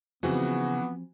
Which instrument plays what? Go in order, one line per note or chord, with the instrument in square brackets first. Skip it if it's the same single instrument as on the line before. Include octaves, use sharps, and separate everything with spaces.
[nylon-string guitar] C#3 G#4 [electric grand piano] E3 F#4 [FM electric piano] F3 C4 [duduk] B3